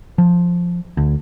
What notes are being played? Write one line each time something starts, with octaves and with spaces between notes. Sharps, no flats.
F3
D2